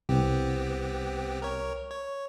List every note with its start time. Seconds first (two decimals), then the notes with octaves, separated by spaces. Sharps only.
0.09 C2 B3 C4 G4
1.42 A#4 C#5
1.91 C#5